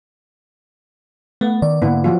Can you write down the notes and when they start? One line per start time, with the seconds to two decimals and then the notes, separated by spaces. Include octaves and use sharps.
1.41 A3 B3
1.62 D#3 D5
1.82 G#2 D3 A#3 B3 E4
2.04 F3 F#3 F4